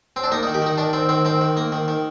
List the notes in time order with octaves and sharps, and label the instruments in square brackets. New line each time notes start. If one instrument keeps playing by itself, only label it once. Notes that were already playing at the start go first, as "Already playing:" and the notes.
[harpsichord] C4
D4
A#3 D#4
D#4
D#3
G4
D#3 D#4
D#3 D4
D#3 C4
D#3 C4
D#3 C4
D#3
A#3
D#3
D#3